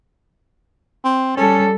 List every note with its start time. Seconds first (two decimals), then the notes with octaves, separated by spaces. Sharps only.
1.04 C4
1.37 G3 C#4 A4